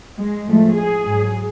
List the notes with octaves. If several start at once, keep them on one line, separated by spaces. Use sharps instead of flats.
G#3
A2 F3 G#3 A3
G#4
G#2 F#3